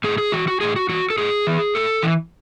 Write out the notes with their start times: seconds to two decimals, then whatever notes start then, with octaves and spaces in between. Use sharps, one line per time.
0.04 A2 G#4
0.18 G#4
0.32 E3 F#4
0.48 F#4
0.61 A2 G#4
0.76 F#4
0.89 E3 F#4
1.10 A4
1.18 A2 G#4
1.47 E3
1.75 A2 A4
2.03 E3